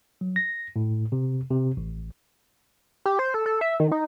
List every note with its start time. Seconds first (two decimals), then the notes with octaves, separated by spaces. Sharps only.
0.21 F#3
0.36 A#6
0.76 A2
1.12 C3
1.50 C3
1.77 A1
3.05 G4
3.19 C5
3.34 A4
3.46 A4
3.61 E5
3.80 D#3
3.92 D#4